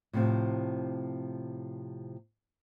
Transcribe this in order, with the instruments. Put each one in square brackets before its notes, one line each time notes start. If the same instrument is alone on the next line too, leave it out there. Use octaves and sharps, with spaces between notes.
[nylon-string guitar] A2 C3 F3